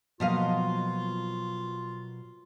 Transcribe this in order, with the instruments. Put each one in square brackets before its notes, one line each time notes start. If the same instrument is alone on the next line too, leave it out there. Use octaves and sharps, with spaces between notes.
[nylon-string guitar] B2 F#3 A#3 [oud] F3 D#5 F5 [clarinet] F4